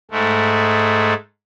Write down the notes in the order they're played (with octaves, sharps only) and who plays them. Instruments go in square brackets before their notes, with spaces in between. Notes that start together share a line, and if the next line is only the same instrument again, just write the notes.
[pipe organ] G#2 G#3 A3